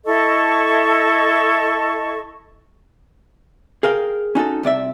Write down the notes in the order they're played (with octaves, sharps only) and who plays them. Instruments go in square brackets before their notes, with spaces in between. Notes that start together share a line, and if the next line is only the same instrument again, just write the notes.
[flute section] E4 A4 D#5 C#6
[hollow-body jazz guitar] G#4 A#4 F5 G5
C#4 D#4 F#4 A4
C2 C3 D5 E5